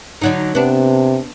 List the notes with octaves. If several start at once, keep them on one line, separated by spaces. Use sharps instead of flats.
D3 F#3 D#4
C3 B3 D4